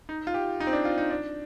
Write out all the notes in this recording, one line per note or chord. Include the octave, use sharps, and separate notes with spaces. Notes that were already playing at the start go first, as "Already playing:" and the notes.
D#4
F4
G4
D#4
C4
D4
F4
D#4
D4